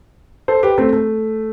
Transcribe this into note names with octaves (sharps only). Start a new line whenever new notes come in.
A4 C5
G4 B4
A3 C4
A3